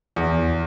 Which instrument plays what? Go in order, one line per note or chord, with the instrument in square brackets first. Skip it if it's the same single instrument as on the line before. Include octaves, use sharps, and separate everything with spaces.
[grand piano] E2